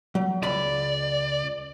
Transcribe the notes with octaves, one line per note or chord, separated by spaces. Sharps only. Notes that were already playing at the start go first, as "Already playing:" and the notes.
F#3
C#2 D5 B5